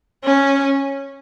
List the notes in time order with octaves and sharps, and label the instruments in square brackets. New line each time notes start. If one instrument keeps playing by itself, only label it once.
[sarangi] C#4